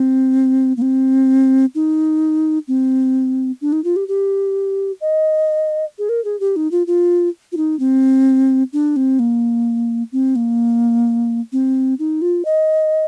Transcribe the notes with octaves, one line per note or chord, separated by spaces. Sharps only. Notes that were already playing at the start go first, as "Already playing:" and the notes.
Already playing: C4
A#3
C4
D#4
C4
D4
D#4
F4
G4
G4
D#5
G#4
A#4
G#4
G4
D#4
F4
F4
F4
D#4
C4
D4
C4
A#3
C4
A#3
C4
D#4
F4
D#5